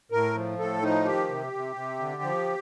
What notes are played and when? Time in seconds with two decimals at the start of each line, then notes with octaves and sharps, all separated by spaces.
0.11 A2 A#4
0.35 F3
0.59 A2 A4
0.82 F3 D#4
1.05 D#3 G4
1.29 C3
1.53 C3
1.76 C3
1.99 D3
2.22 F3